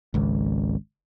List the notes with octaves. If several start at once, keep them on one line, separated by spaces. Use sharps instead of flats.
G#1 C#2